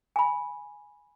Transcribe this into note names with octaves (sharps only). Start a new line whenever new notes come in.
G#5 B5